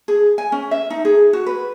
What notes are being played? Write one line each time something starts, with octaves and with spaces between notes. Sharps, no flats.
G#4
G#5
C#4
E5
D#4
G#4
F#4
B4